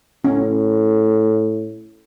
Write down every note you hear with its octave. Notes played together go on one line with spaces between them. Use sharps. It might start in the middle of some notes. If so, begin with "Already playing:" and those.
A2 C#4